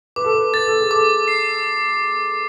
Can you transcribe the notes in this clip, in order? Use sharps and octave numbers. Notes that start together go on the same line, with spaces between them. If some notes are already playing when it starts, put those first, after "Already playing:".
B4 D6
A4
B4
B4 A6
A4
G#4
A4 D6
C7